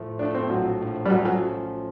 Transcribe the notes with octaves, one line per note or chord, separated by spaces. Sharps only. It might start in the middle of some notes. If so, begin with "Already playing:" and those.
Already playing: A2 F3 A3
A2 F3 A3 D4
C4
A#1 A2 F3 F#3
A#1 A2 F3
G3
F3 F#3 A3 C#4
F#3